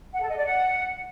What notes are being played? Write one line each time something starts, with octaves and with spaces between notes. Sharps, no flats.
F#5
A4
D#5
D5
F#5